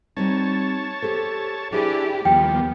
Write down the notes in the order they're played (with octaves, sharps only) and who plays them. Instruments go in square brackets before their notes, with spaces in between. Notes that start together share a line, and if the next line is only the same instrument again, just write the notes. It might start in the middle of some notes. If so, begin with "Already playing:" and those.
[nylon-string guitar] G3 C4 D#4 [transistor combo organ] C#5 A5
[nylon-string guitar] G4 A4 C5
[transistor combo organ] D4 [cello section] E4 G4 [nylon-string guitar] G#4 C5 G#5
[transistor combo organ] D#2 F3 G3 [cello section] B3 [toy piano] G5